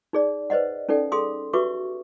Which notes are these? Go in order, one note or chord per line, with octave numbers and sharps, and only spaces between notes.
D#4 G#4 D5
B4 C5 D5 D#5 F#5
C#4 D#4 A4 D5 G5
G#4 A4 F5 C6 D#6
F#4 G4 B4 E5 C#6 D6